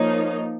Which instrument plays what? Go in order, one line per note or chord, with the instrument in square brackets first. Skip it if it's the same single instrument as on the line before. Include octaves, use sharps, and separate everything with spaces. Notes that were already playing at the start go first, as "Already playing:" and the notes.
Already playing: [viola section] F3 A#3 D#4 [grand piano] C#5